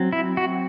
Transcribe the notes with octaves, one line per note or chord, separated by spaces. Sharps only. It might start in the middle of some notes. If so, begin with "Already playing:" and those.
Already playing: F#3 C4
E4
F#4